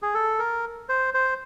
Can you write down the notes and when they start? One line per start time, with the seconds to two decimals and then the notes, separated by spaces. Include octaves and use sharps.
0.02 G#4
0.14 A4
0.39 A#4
0.89 C5
1.14 C5